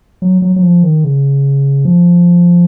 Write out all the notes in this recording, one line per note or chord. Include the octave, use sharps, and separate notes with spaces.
F#3
F#3
F#3
F3
D#3
C#3
F3